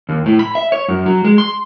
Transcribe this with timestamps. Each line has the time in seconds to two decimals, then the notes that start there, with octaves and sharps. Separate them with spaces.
0.09 D#2
0.26 A2
0.39 B5
0.55 E5
0.72 C#5
0.88 F#2
1.06 F#3
1.25 G#3
1.38 C6